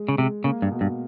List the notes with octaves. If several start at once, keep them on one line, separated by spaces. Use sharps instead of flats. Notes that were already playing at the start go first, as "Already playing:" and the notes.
Already playing: G#3
C#3
C3 G#3
C#3 A#3
G2
B2
G2